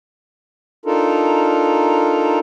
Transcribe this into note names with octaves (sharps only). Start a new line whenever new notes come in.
D4 D#4 F4 A4 A#4